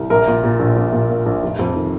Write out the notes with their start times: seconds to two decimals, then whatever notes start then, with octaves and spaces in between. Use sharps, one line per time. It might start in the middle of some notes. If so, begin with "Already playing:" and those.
Already playing: C2
0.10 A#1 A#4
0.27 A#2
0.44 A#2
0.60 A#1
0.76 A#1
0.93 A#2
1.10 A#2
1.26 A#1
1.43 F1
1.59 F2
1.76 D#3